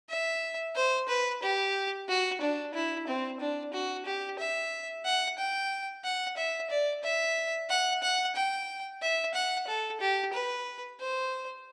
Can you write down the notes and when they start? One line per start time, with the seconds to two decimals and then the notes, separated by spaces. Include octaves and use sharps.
0.10 E5
0.76 C5
1.09 B4
1.43 G4
2.09 F#4
2.41 D4
2.74 E4
3.07 C4
3.40 D4
3.73 F#4
4.06 G4
4.39 E5
5.05 F#5
5.38 G5
6.04 F#5
6.37 E5
6.70 D5
7.03 E5
7.70 F#5
8.03 F#5
8.36 G5
9.02 E5
9.34 F#5
9.68 A4
10.01 G4
10.33 B4
11.00 C5